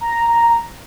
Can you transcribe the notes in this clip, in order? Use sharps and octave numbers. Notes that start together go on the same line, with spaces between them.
A#5